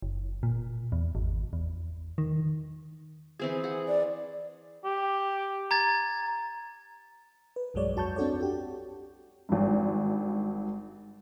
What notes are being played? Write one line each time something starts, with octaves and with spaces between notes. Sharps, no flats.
F#1
A#2
E2
G#1
E2
D#3
E3 C4 G#4
G#4 F#5
D5
G4
A#5 G#6 A6
B4
B1 G2 F#3 G#3 C#5 D5
F2 F#4 A5 C#6 G6
C4 D4 F#4 A4 C#5 D5
F#4 G4
G#1 G2